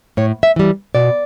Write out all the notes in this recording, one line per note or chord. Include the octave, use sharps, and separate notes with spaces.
A2 C#5
E5
E3 G3
B2 D5